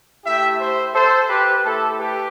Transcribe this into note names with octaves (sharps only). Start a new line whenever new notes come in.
A3 E4 G4 E5 G5
C5 E5
A4 C5
G4 B4
A3 E4 G4 A4
G4 B4